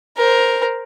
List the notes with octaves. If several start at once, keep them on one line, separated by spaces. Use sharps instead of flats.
A#4 C5